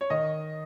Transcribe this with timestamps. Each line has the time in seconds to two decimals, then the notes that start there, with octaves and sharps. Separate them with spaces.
0.01 C#5
0.10 D#3 D#5